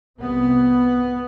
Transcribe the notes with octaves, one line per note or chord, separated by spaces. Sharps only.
C2 C3 B3